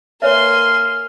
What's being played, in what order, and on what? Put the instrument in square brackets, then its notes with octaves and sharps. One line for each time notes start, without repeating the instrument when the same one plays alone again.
[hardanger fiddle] A#3 [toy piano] B4 C#5 E5 [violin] G#5 C6 [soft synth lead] F6